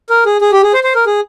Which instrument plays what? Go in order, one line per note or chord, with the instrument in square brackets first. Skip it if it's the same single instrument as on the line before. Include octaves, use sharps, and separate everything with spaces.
[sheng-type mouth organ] A#4
G#4
G#4
G4
G#4
C5
C5
A#4
G#4